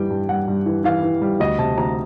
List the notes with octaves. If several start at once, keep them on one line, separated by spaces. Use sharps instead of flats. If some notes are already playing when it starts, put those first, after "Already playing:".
Already playing: G2 E3 G3 G5
G2
G3 F#5
G2
E3
E3 F5
E3
G3
D2 D#5
C3 A5
D2 A#5